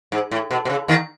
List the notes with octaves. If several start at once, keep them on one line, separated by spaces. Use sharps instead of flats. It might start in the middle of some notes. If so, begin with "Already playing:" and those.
G#2
A2
B2
B2
C#3
D#2 D#3